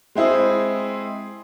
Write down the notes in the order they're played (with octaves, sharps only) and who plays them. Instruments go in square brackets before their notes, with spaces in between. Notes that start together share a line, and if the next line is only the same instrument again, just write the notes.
[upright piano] G#3 C4 E4 G#4